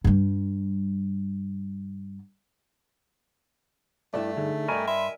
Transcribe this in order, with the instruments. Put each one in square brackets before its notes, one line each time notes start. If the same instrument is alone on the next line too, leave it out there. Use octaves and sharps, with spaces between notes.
[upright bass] G2 G3
[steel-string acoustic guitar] G2 E5 [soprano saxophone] A3 [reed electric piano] E4 D5
[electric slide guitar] D3 [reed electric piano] D#4 G#4
[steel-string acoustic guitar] E2 G2 [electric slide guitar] A#4 D#5 G#5 [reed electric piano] A#5 B5 C#6
[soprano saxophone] E5 [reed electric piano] B5 C6